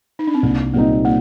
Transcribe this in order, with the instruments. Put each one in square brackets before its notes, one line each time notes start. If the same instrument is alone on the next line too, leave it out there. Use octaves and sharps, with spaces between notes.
[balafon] D#4
D4
C4
[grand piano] C2 [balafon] A#3
[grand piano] A#2 G3 C4 D#4 [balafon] A#3
[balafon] A#3